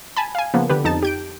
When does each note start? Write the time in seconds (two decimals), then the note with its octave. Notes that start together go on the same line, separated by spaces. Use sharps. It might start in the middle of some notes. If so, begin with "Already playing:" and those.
0.17 G#5 A5 B5
0.35 F5 G#5
0.54 C#3 F3 A#3 B3
0.70 D3 B3 G4 B4
0.84 F2 D#4 A5 A6
1.03 G4 G6 D7